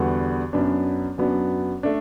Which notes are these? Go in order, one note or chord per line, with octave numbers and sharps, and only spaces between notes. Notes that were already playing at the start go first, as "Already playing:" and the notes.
Already playing: E2 D3 G3 B3 F#4
F#2 F#3 B3 D4
F#2 F#3 B3 D4
A3 D4